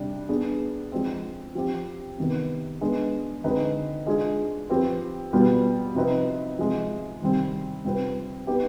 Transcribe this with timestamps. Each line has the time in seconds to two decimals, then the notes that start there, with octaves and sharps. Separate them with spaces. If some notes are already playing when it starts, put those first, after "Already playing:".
Already playing: C3 G3 D4
0.29 B3 D4 G#4 B4
0.92 F3 G#3 C4
1.55 F3 C4 G4
2.18 C3 D#3 B3
2.81 G#3 B3 D4
3.44 D3 G#3 C4 D#4 B4
4.06 G#3 D4 F4 G#4
4.69 F3 C4 G4 B4
5.33 B2 G3 B3 F4
5.95 C3 F3 C4 D#4 B4
6.59 C3 F3 G#3
7.21 C3 D#3 G3 C4
7.85 C3 G3 C4 F4 B4
8.47 B3 D#4 G4 B4